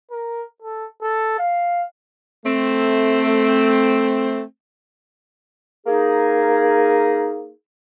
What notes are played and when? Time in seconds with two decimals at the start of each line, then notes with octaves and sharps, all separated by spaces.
0.11 A#4
0.62 A4
1.02 A4
1.39 F5
2.45 A3 C4
5.86 A#3 D#4 G#4